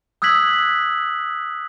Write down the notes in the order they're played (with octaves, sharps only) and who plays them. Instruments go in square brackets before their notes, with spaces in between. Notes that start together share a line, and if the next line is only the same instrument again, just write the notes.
[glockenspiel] D#6 E6 F#6 G#6 B6 F#7